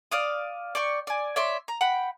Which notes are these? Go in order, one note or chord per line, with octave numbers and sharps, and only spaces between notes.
D5 F5 D#6
D5 G5 C#6
D5 G#5
C#5 D5 E5 C6
A#5
F#5 G5 B5